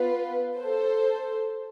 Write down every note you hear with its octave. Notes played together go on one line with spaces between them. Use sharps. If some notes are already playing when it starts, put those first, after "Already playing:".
Already playing: B3 F4 B4
A4 C5